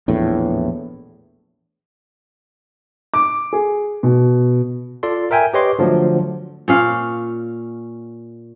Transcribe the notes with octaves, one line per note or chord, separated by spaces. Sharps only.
A#1 E2 A2
D6
G#4
B2
F4 A4 D5 C6
A#4 E5 G5 G#5
G4 B4 C#5 D#5 C6 D6
D3 F3 F#3 A3 D4
A#2 C#4 F5